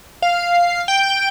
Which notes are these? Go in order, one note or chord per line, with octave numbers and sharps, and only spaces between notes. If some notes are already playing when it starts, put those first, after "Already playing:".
F5
G5